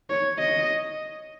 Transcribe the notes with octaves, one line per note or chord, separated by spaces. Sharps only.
C#5
D#5